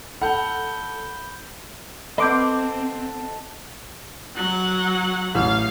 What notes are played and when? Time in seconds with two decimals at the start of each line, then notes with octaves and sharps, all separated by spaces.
0.22 A4 F#5 B5 G6 G7
2.18 C4 A4 B4 D#5 F#5 C6 D6 G6
4.35 F#3 F#5
5.35 A1 F5